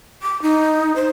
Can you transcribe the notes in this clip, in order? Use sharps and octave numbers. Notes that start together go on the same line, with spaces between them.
D6
D#4
C5